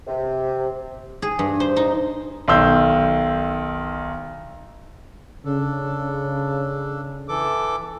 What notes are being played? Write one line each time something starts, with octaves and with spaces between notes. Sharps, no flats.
C3
G#4
G2
C5
D#4
B1 D#3 C6 E6 G6
C#3 D4 A4
E3 A4 D6